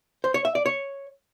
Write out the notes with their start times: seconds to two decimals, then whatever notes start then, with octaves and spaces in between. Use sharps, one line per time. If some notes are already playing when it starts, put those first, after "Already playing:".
0.24 C5
0.34 C#5
0.45 E5
0.55 D5
0.66 C#5